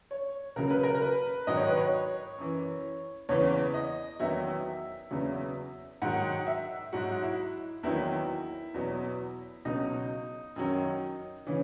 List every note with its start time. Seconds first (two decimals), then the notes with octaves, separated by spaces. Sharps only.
0.11 C#5
0.56 C#2 C#3 F#3 A#4
0.70 B4
0.83 A#4
0.95 A#4
1.02 B4
1.47 G#2 D#3 F#3 D#5
1.57 C#5
1.67 B4
1.77 C#5
2.38 F#2 E3
3.29 E2 C#3 E3 C#5
3.74 D#5
4.20 E2 D#3 F#3 E5
5.11 E2 C#3 F#3
6.02 G#2 D#3 F#3 F#5
6.47 E5
6.93 G#2 F#3 F#4
7.22 E4
7.83 E2 D#3 F#3 E4
8.74 E2 B2 F#3
9.65 C#2 B2 F#3 D#4
10.56 F#2 D#3 F#3
11.47 C#3 E3 C#4